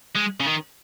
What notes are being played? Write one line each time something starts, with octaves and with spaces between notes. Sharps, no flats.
G#3
C#3
D#3